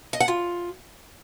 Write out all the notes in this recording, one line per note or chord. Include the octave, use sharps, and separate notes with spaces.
D#5
F#5
F4